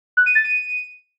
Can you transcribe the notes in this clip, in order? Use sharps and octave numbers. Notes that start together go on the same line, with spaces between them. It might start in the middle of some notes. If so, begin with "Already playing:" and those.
F#6
D#7
A6
D#7